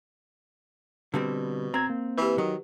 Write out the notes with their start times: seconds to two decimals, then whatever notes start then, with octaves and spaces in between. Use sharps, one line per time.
1.14 B2 D3 G3 C4
1.74 C4 A#5 G#6
1.90 A#3
2.18 E3 G4 B4
2.38 D#3 F#3